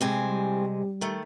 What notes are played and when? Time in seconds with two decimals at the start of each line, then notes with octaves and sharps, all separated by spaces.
0.01 A2 C3 G#3 C4 G#5
0.23 G3
1.01 D#3 A3